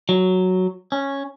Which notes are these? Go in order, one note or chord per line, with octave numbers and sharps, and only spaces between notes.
F#3
C#4